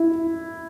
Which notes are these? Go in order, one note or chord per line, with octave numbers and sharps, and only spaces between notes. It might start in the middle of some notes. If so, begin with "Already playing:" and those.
Already playing: E4